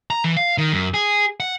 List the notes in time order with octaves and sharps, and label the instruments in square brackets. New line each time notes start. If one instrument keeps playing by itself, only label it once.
[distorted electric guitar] A#5
E3
F5
D#3
F#2
G#4
F#5